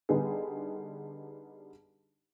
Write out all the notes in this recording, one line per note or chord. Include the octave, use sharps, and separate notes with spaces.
D3 G3 B3 D#4 G#4